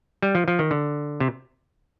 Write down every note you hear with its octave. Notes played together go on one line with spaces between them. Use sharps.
G3
F3
F3
D#3
D3
C3